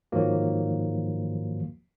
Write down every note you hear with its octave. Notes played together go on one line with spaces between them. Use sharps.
G#2 D#3 F3 F#3 A#3